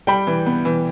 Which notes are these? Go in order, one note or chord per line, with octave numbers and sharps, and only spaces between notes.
G3 G5 B5
E3
B3
E3